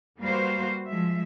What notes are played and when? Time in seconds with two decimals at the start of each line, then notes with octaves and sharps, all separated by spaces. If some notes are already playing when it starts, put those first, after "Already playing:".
0.21 G3 A#3 F#4 B4 C5 F5
0.88 F3 G#3 E5